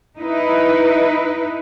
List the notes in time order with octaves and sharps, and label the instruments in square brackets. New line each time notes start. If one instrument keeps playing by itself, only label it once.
[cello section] D#4 E4 B4